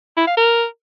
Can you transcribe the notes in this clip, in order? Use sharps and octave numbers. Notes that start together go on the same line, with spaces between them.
E4
F5
A#4